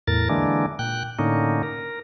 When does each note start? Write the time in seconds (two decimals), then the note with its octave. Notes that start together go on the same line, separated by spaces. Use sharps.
0.07 E2 A2 A#4 A6
0.29 D3 E3 G#3 A#3 D4
0.79 A#2 G5 F#6
1.19 A2 D3 A#3 C#4 D#4
1.63 A#4